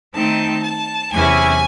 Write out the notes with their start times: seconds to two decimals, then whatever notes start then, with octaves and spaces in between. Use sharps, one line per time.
0.14 D#3 A3 C4 D#4 A5
0.64 A5
1.12 E2 C3 F#3 C#4 E4 G#5